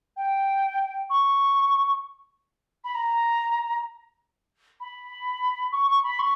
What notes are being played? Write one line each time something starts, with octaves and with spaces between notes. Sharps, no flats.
G5
C#6
B5
A#5
B5
C#6
C#6
B5
C#6